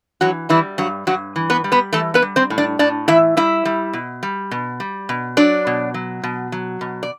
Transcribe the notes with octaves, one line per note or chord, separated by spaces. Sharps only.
E3 F#3 F#4
E3 G3 E4
G2 F#3 F#4
G2 F#3 F#4
E3
B3 B4
G3
B3 B4
E3 A3 A4
B3 B4
G3
C4 C5
A2
D4 D5
A2 D4 D5
E3 E4 E5
G3 E4 E5
G3
B2
G3
B2
G3
B2
F#3 D4 D5
B2
F#3
B2
F#3
B2
D5